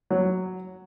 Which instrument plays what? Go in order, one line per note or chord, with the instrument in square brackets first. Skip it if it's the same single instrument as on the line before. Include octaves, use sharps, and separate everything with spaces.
[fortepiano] F#3